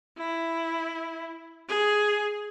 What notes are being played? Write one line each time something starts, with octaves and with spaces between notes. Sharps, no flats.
E4
G#4